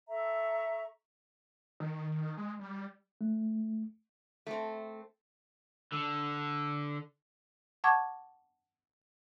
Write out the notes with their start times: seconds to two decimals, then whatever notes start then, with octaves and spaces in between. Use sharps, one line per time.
0.10 A4 E5 A#5 C#6
1.80 D#3
2.38 G#3
2.60 G3
3.21 A3
4.47 A3 C4
5.92 D3
7.84 F#5 A5 C#6 D6 G#6